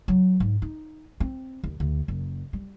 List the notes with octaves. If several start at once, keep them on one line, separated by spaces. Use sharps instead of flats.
F#3
G#2
D#4
C4
D#2
D2
F#1
G3